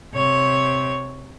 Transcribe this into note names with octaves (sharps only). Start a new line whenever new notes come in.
C3 C#5